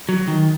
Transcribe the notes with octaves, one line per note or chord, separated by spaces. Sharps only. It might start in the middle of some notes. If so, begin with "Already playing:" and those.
F#3
D#3